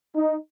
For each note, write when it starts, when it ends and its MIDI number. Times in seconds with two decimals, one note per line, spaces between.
0.15 0.36 63